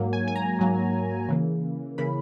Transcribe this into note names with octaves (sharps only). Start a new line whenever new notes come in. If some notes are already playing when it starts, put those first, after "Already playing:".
Already playing: G#2 F#3 A#3
G#5
G#5
A#5
G#2 F#3 A#3
C#3 E3 A#3
C#3 E3 A#3 B5